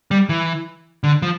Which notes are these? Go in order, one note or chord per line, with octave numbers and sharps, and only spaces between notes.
G3
E3
D3
F3